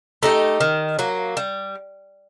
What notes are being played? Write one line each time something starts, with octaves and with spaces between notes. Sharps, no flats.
A3 D#4 G4
D#3
F#3 A#3
G3